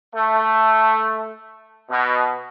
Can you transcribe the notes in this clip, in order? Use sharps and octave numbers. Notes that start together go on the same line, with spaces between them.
A3
B2